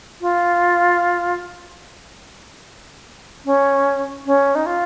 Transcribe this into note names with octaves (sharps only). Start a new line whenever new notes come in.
F4
C#4
C#4
D#4
F4